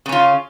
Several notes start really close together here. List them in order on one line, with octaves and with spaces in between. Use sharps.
C#3 C#4 F4